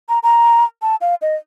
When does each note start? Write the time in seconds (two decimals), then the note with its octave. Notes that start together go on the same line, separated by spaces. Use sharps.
0.09 A#5
0.23 A#5
0.82 A5
1.01 F5
1.22 D#5